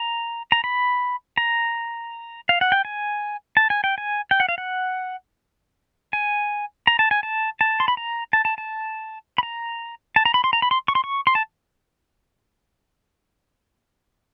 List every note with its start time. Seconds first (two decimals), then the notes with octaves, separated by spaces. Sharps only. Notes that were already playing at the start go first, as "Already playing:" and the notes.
Already playing: A#5
0.52 A#5
0.64 B5
1.38 A#5
2.49 F5
2.61 F#5
2.72 G5
2.85 G#5
3.57 A5
3.70 G#5
3.84 G5
3.98 G#5
4.31 G5
4.40 F#5
4.49 F5
4.58 F#5
6.13 G#5
6.87 A#5
6.99 A5
7.11 G#5
7.23 A5
7.61 A5
7.80 C6
7.88 B5
7.97 A#5
8.33 A5
8.45 A5
8.58 A5
9.38 B5
9.43 A#5
10.16 A5
10.25 A#5
10.34 B5
10.44 C6
10.53 A#5
10.62 B5
10.71 C6
10.88 C#6
10.95 C6
11.04 C#6
11.27 C6
11.35 A5